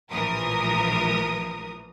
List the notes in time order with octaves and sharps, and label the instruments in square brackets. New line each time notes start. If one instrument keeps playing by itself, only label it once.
[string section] A#1 A2 E3 F3 A#4 D#6